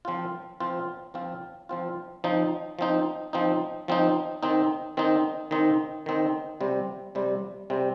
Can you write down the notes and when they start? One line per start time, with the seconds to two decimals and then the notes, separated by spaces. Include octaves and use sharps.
0.05 F3 C4 F4
0.60 F3 C4 F4
1.14 F3 C4 F4
1.69 F3 C4 F4
2.24 F3 C4 D#4
2.79 F3 C4 D#4
3.33 F3 C4 D#4
3.88 F3 C4 D#4
4.43 D#3 C4 D#4
4.97 D#3 C4 D#4
5.51 D#3 C4 D#4
6.06 D#3 C4 D#4
6.61 C3 G3 C4
7.15 C3 G3 C4
7.70 C3 G3 C4